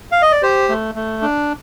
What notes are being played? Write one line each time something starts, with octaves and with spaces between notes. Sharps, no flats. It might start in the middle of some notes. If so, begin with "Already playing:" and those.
F5
D#5
D5
G4 C5
A3
A3
D4